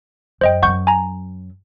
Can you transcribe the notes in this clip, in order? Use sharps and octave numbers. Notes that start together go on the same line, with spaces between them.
F#2 C5 D#5 G5
F#2 F#3 F#5 C#6 G6
G#5 A#5